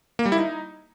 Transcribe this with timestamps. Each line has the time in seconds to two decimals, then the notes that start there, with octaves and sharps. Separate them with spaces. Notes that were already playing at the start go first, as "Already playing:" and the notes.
0.19 A#3
0.25 G3
0.32 E4
0.38 D#4